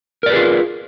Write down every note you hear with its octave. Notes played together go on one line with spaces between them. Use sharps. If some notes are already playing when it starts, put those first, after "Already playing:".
F4 G#4 A#4 B4 D5